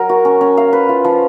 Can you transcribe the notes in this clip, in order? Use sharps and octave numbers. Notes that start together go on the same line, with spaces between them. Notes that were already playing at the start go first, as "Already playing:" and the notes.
Already playing: F#3 A#4
F#4
C#4
C#4
F5
B4
F4
F3